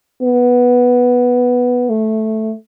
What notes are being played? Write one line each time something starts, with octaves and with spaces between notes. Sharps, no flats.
B3
A3